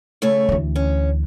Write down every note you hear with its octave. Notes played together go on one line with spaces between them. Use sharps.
C#3 A3 C#5
D2 E3
C#4